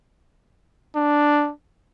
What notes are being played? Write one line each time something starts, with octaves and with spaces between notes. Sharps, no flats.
D4